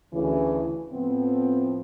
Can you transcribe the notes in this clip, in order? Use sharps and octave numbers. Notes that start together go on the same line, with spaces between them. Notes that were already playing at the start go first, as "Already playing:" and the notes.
D2 C#3 E3
A2 F3 B3 C4